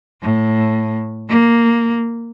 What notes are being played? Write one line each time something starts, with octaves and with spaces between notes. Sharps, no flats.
A2
A#3